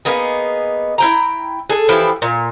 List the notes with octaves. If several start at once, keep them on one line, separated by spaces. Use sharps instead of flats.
A#3 B3 D#4 G#4
E4 G5 A#5
G#4 A4
E3 F3 E4 G4
A#2